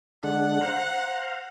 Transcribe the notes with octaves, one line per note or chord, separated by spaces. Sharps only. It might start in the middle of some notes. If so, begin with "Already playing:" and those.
D3 G#3 D4 F#5
C5 F5 A#5